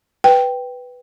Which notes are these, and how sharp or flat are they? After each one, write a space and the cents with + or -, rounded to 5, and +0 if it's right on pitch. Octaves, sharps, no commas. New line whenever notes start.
B4 +0 G5 +0